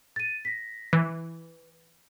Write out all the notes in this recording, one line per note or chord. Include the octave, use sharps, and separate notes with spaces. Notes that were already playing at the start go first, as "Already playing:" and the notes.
A6 D#7
A#6 B6
E3 B4